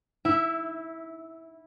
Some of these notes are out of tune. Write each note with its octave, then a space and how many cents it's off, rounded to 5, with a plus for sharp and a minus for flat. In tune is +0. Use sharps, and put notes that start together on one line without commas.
E4 -15 E5 +10